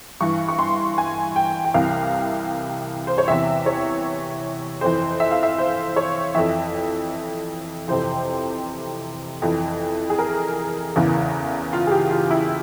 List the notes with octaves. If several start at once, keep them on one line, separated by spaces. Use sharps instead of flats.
G2 E3 C#6
C#6
C6
G#5
G5
G5
C2 C3 E3 F5
C5
C#5
E2 C3 E3 E5
C#5
F2 E3 C5
E5
F5
E5
C5
C#5
F2 E3 E5
F2 C3 E3 C5
F2 E3
G#4
A#4
E2 C#3 E3
F4
G#4
G4
F4
E4